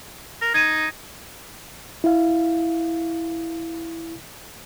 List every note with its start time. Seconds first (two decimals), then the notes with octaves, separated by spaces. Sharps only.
0.42 A#4
0.54 D#4 G#6 D#7
2.04 E4 F5